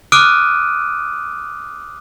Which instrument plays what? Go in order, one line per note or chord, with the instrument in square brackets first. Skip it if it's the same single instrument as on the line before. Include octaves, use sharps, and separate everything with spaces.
[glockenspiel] D6 D#6 F6 F#6 D7 D#7